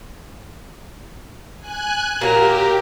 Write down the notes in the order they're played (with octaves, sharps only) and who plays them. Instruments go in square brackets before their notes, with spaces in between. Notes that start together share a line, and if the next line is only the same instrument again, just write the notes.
[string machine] G#5 F#6
[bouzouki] A#2 F#3 [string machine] G4 [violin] A#4